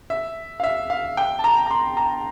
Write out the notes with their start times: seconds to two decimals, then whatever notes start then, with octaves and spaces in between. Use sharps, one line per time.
0.10 E5
0.60 F5
0.63 E5
0.90 F5
1.17 G5
1.39 A5
1.44 A#5
1.66 A#5
1.71 C6
1.97 A#5